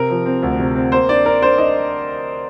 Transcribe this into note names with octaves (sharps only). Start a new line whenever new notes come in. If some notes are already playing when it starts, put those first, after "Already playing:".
Already playing: C3 A#4
F3
C4
D2
C3
C4
A#3 C5
D4 D5
D4 A#4
D4 C5
D4 D#5